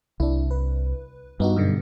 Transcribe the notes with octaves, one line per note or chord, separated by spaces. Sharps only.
C2 D4 E4
B4
G2 B3 D#4 F#4
F#2 B2 D3